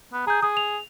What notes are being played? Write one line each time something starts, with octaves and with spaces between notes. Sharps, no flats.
B3
G#4 A#5 G6
G#4 D#6
F7